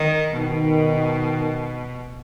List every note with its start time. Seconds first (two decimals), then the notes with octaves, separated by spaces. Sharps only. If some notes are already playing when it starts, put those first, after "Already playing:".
Already playing: D#3
0.36 B2 D#3